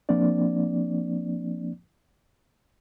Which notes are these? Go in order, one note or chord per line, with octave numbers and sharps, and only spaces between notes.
F3 A#3 C4 D4 D5